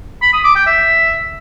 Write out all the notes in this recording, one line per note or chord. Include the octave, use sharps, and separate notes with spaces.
B5
D#6
D6
G5
E5